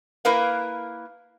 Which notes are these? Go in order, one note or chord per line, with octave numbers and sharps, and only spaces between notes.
A#3 E4 A#4 B4 F5